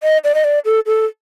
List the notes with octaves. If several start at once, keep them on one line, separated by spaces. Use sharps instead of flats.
D#5
D5
D#5
D5
A4
A4